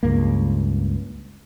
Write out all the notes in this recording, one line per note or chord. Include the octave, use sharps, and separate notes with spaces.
C#2 G2 A#3